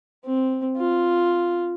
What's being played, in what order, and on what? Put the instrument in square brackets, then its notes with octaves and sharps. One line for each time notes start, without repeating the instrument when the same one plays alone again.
[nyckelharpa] C4
F4